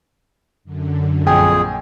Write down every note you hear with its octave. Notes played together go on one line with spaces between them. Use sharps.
F#2 D3
A#1 F2 G#4 G5 G#5